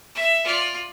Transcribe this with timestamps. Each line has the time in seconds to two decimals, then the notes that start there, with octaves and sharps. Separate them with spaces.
0.15 E5
0.44 F4 D5